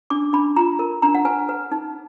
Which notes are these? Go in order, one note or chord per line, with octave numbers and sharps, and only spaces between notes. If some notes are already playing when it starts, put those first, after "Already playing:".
D4 D6
D4 B5
F4 A#5
A#4
D4 A#5
F#5
B4 G#5
B4
D#4